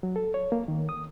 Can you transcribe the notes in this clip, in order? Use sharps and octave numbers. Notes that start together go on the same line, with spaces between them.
F#3
A4
C#5
A#3
D#3
D#6